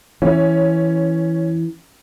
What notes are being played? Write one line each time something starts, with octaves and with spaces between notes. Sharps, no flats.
E3 C#4